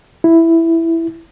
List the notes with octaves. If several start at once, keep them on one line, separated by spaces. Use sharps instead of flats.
E4